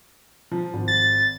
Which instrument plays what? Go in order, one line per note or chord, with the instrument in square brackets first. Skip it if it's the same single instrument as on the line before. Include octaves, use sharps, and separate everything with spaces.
[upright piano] F3
G#1
[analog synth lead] A6